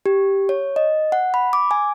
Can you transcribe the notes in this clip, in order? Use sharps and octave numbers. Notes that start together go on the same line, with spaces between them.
G4
C#5
D#5
F#5
B5
D6
G#5